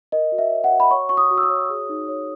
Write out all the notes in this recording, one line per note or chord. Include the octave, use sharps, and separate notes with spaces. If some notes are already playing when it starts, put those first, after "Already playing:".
A#4 D#5
F#4
E5
C#5
F#5
F#4
B5
C#5 C#6
F#4 C#6
D#6
F#4
E6
D#6
C#5
G#4
D#4
C#5